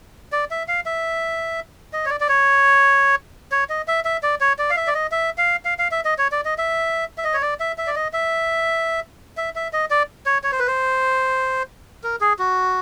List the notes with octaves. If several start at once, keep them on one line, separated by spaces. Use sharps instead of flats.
D5
E5
F5
E5
D#5
C#5
D5
D5
C#5
C#5
D#5
E5
E5
D5
C#5
D5
F5
E5
D5
D#5
E5
F5
F5
F5
E5
D#5
C#5
D5
D#5
E5
E5
D#5
C#5
D5
E5
E5
D5
D#5
E5
E5
E5
D#5
D5
C#5
C#5
C5
B4
C5
A#4
G#4
F#4